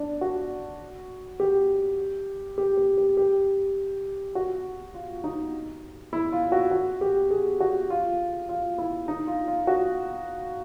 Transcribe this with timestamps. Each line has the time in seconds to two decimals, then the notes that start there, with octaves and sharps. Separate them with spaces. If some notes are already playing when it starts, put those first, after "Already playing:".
Already playing: D4
0.21 F#4
1.40 G4
2.58 G4
2.77 G4
2.98 G4
3.17 G4
4.35 F#4
4.94 F4
5.24 D#4
6.13 E4
6.32 F4
6.52 F#4
6.71 F#4
7.01 G4
7.31 G#4
7.60 F#4
7.90 F4
8.49 F4
8.78 E4
9.08 D#4
9.27 F4
9.48 F4
9.67 F#4